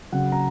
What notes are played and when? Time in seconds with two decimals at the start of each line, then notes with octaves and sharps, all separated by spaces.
0.12 C#3 F#3 F#5
0.32 A#5